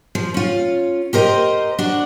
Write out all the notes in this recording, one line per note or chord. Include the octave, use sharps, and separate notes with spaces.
F3
C#4 F4
G4 A#4 C5 D#5
D4 F#4